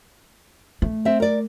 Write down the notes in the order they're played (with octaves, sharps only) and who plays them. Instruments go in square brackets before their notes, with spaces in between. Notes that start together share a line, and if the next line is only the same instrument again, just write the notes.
[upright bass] A3
[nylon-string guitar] C4 E5
A#4 D5